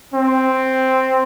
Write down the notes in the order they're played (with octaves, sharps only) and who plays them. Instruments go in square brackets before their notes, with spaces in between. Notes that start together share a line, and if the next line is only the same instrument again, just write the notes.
[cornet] C4